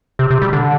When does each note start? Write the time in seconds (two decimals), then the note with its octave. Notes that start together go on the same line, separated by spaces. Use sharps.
0.19 C3
0.30 C3
0.42 G3
0.53 D3